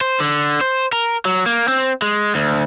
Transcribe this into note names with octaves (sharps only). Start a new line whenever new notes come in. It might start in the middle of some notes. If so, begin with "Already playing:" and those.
C5
D3
C5
A#4
F#3
A#3
C4
G#3
D2